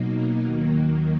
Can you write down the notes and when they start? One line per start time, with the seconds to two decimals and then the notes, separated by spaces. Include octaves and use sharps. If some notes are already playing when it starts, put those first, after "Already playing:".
Already playing: B2 F#3 A#3 D#4
0.44 D#2 D#3 F#3 A#3